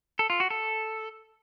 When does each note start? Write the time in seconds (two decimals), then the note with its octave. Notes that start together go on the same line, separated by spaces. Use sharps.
0.19 A4
0.30 F4
0.40 F#4
0.50 A4